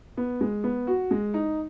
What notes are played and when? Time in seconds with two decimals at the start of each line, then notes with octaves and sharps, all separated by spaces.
0.17 B3
0.41 G#3
0.64 B3
0.87 F#4
1.11 G#3
1.34 D#4